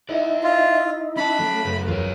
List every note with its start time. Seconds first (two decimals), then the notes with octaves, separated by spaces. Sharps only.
0.09 D#4 E4 D5 E5
0.44 F4 E6 A#6
1.17 C#4 A5 B5
1.39 F#3 A3 F4
1.64 F#2 A2 C#3 B4
1.88 E2 B3 F4 G#4 A#4 C#5